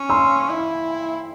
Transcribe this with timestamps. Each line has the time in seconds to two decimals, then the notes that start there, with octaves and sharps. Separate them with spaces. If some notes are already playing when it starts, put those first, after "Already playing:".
Already playing: C#4
0.10 C6 E6
0.50 E4